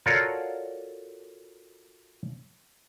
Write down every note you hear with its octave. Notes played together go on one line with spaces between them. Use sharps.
F4 F#4 A4 A#4 C#5 D5